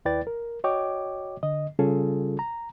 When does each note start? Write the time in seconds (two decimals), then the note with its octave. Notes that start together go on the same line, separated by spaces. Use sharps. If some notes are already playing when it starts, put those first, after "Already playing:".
0.05 D#2 E4 B4 D5 G5 A6
0.27 A#4
0.64 F#4 C#5 D#5 G5 D6
1.43 D3 D#5
1.79 C#3 G3 C#4 F4 G#4 A4
2.39 A#5